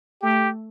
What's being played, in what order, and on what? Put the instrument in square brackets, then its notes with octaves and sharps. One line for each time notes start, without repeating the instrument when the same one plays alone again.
[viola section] A3 [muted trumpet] G4